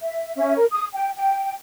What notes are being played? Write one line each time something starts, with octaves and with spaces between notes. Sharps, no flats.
E5
C#4 E5
A#4
D#6
G5
G5